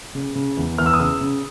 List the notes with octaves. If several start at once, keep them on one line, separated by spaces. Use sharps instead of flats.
C#3
C#3
E2
E2 F6
E6
D#6
C#3 E6
C#3